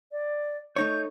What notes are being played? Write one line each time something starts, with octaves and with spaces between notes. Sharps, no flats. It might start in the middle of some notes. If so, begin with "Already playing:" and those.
D5
A3 D#4 C#5 G6